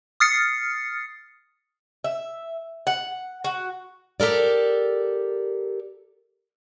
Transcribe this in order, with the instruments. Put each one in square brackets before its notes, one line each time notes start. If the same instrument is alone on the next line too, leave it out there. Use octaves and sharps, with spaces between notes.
[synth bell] D#6 F6 A6 C7 C#7
[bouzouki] E5
F#5
F#4
[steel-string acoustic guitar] G4 A4 A#4 D5